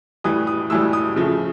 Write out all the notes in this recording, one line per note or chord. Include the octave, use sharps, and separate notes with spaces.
A2 E3 G3 D#6
D#6
A2 E3 G3 E6
D#6
C#3 F3 A3